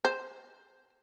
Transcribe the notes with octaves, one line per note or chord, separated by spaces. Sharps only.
C5